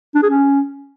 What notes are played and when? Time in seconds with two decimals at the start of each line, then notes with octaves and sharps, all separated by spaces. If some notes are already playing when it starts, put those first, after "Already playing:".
0.15 D4
0.23 G#4
0.30 C#4